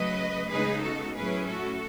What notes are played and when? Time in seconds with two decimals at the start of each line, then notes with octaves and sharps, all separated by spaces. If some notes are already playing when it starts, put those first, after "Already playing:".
Already playing: C#3 F#3 A3 B4 D#5
0.50 C#3 G#3 B3 D#4 G#4 B4
0.83 F#4 A4
1.15 A2 F#3 C#4 E4 G#4 B4
1.48 F#4 A4